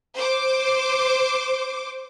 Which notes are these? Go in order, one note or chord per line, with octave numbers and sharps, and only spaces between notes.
C5 D6